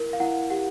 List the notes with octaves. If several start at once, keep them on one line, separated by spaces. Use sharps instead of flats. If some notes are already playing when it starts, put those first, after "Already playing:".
Already playing: E4 A#4
F5
E4 F#5
G4 F#5